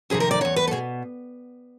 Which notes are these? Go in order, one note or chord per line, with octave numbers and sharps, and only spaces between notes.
F2 C3 D#3 G#4
A#4
D5
E2 B2 C#5
B4
A4
B2 G#4